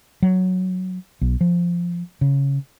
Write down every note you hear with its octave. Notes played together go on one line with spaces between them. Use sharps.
F#3
B1
F3
C#3